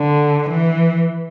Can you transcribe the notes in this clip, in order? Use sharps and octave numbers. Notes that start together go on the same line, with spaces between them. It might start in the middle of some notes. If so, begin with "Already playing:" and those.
Already playing: D3
E3